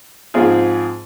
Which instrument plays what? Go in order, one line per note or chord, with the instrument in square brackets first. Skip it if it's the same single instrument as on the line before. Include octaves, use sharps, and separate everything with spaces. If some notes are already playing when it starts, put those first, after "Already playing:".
[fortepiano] G#2 F3 C4 F4 G#4